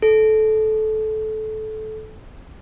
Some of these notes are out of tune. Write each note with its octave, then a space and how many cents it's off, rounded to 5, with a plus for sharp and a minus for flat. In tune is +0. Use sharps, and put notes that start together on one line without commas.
A4 -20